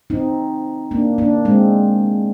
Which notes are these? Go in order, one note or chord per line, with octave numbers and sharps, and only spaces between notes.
C4 D#4
A#3 D4
A#3 D4
G#3 C4